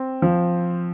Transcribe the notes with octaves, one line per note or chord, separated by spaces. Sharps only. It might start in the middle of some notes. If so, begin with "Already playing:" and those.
Already playing: C4
F3